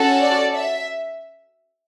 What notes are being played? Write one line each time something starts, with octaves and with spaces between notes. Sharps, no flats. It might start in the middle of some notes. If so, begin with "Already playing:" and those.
Already playing: C#4 F#4 A4
D5
E5